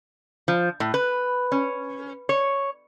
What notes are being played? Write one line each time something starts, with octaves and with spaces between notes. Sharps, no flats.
F3
A2
B4
C#4
C#5